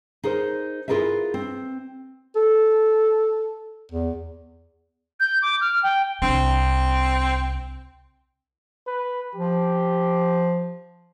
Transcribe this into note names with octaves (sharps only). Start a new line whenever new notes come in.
D#4 G#4 A#4 C5
E4 F4 G#4 A#4 B4 E5
C4
A4
E2
G6
D6
F6
G5
C2 C4 D4
B4
F3 G4